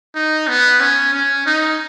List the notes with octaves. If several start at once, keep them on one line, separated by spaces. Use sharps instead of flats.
D#4
B3
C#4
C#4
D#4